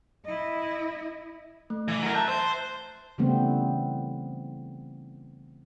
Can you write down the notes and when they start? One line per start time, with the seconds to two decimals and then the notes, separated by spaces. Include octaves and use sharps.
0.25 E4 D#5
1.70 A3
1.88 E3
2.02 F#3 A#4
2.15 E5 A5 F#6 G6
2.29 C5
3.18 C#3 E3 G3 A3 B3 C4